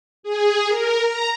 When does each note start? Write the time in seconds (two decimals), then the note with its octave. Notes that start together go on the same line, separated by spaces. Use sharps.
0.23 G#4
0.67 A#4
1.01 A#5